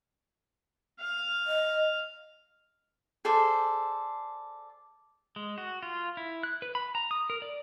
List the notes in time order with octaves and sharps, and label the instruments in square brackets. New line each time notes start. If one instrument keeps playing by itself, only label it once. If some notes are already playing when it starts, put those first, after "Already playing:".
[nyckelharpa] F5
[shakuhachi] D#5
[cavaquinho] G#4 A4 C5 D5
[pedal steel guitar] G#3
F#4
F4
E4
F#6
B4
B5
A#5
D#6
A#4
D5